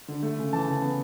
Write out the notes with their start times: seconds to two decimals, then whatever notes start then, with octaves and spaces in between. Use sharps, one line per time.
0.08 D3
0.23 A3
0.38 C#3
0.53 E3 A5
0.68 C#3
0.82 B3